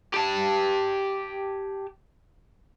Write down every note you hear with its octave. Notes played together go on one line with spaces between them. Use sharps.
G4 A5